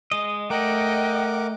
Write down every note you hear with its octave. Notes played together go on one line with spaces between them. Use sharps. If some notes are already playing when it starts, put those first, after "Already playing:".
G#3 D#5
A3 A#4 D5 D#5 F#5 G5 D6